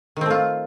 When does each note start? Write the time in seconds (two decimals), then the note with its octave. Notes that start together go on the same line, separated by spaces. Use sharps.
0.17 D#3
0.21 C4
0.26 A3
0.30 F4